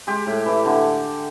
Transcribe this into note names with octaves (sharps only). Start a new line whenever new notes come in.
G#3 G4
A2
E3
D3